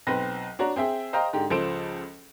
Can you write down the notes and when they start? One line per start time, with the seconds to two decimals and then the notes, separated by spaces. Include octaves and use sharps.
0.07 B1 C4 B4 A#6
0.59 D4 F#4 C#5 A#5
0.76 C4 G#4 E5 G5
1.13 C5 D#5 F5 G5 A#5
1.33 G#2 D3 G4
1.50 C#2 F3 A4 C5 D7 E7